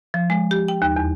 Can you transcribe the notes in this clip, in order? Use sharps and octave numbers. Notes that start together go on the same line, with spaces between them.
F3
G#3
G4
G5
D#2
E2